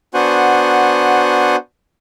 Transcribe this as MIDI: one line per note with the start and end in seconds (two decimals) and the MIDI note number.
0.14 1.56 59
0.14 1.56 62
0.14 1.56 66
0.14 1.56 72
0.14 1.56 78
0.14 1.56 80